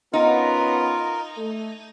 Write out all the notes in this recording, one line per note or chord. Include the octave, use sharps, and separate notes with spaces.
B3 C#4 D#4 F4 A#4
A3